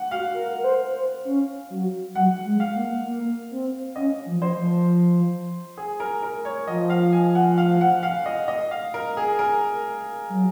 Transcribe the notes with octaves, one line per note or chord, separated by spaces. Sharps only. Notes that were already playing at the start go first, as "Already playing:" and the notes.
Already playing: F#5
F#4 F5
A#4
A#4
C5
C5
C#4
F#3
F#3 F#5
G#3
F5
A#3
A#3
C4
C#4 D#5
F3
C5
F3
G#4
A#4
A#4
C#5
F3 D#5
F5
G#5
F#5
F5
F#5
F5
D#5
D#5
F5
A#4
G#4
A#4
F#3